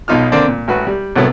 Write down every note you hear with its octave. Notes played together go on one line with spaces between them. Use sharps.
B1 B2 D#4 F4 F6
D3 A#3 C4 D4 D5
A#2
A1 F#4 B4
G3
C2 A2 F#3 A3 B3